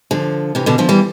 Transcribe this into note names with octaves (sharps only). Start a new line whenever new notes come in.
D3 F3
C3 E3
B2 D3
D3 F3
E3 G3